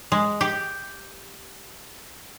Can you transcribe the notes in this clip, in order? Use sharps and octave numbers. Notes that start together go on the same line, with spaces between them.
G#3
G4